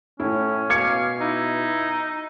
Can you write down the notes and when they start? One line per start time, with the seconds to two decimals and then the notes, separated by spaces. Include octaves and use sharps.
0.20 A2 C#4 E4
0.70 B2 F5 D6 G#6 C#7
1.20 D#4 E4